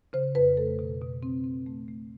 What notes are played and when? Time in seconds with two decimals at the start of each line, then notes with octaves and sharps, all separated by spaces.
0.13 C#3 C5
0.35 F2 B4
0.57 A3 A4
0.79 B2
1.01 B2
1.23 C4
1.44 C4
1.66 A3
1.88 A3